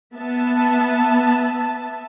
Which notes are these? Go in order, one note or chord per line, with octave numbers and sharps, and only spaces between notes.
B3 E5 A5